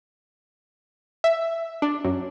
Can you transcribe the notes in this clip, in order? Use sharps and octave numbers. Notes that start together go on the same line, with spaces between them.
E5
D4
F#2